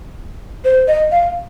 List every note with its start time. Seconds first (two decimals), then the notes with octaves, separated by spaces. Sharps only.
0.65 C5
0.88 D#5
1.11 F5